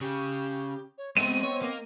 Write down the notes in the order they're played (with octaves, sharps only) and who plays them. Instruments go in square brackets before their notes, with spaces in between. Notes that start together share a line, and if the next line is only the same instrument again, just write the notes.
[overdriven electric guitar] C#3 [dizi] G4
[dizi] C#5
[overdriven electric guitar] G#3 E5 [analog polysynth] B3 C4 [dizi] D#5 [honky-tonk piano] D#7
[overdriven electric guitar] C#5
A#3